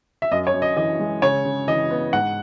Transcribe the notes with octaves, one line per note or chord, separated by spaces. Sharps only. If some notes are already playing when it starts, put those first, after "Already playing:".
E5
F#2 D#5
C#5
F#2
D#5
E3 D#5
G#3
C#3 C#5
C#3
E3 D#5
B3
G#2 F#5